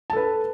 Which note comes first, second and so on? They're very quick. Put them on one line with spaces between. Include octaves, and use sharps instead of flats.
A5 A4 B4